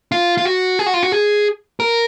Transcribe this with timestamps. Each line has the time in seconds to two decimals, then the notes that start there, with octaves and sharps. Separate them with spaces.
0.12 F4
0.38 F4
0.45 F#4
0.79 G#4
0.86 F#4
0.94 F4
1.03 F#4
1.12 G#4
1.80 A#4